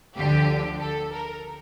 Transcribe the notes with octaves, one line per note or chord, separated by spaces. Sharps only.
D2 D3 F3 G4
A4
A#4